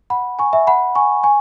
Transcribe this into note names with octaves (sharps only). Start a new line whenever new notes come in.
F#5 B5
G#5 C#6
E5 G#5
F#5 B5
G#5 C#6
G#5 C#6